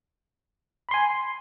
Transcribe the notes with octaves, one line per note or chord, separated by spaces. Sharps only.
G#5 B5 C6